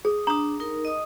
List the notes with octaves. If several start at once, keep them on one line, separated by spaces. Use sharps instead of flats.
G#4 D#6
D4 A#5 D#6
D#4 A#4
D#5 D#6